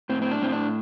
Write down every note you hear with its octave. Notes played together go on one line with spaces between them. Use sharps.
A2 C4
C4
D4
A2 C4
D4